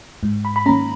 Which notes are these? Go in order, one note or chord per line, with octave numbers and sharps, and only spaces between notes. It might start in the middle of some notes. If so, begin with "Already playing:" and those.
G#2
B5
B5
D#3 A#3 C#4 A#5